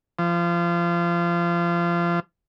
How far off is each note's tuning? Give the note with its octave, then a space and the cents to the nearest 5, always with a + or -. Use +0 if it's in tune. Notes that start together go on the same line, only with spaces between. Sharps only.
F3 -25